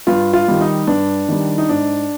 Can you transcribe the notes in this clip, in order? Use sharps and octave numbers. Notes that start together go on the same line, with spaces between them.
G2 F4
F4
D#3 G3
D#4
G2 D4
D#3 G3
D#4
G#2 D4